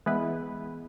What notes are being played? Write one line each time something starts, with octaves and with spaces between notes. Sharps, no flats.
E3 G#3 B3 E4 B4